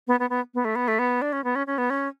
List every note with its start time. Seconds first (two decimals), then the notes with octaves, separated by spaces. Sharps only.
0.08 B3
0.20 B3
0.30 B3
0.54 B3
0.65 A3
0.75 B3
0.88 A3
0.99 B3
1.22 D4
1.33 C#4
1.44 B3
1.55 C#4
1.67 C#4
1.78 B3
1.90 C#4